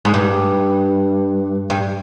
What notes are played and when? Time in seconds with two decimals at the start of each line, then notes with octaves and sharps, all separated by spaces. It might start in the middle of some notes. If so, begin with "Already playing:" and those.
0.05 G#2
0.14 G2
1.70 G2